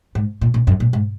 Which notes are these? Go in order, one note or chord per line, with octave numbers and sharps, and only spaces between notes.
G#2
A#2
A#2
F#2
A#2
G#2